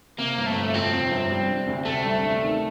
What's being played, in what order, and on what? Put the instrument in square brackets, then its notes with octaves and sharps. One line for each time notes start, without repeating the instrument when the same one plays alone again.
[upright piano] C3 [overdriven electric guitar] A#3
[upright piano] G1
[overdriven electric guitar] A3
[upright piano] G1
[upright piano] F2 [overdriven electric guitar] C4
[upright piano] C3
G1
G3
D4
D2
[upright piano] C3 [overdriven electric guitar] A3
[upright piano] G3
D4
D#3